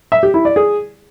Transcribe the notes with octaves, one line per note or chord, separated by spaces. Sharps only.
E5
G4
E4
D5
G#4